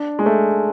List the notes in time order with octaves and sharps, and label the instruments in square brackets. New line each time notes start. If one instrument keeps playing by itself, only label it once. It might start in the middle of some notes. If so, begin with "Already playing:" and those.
Already playing: [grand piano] D4
G#3
A3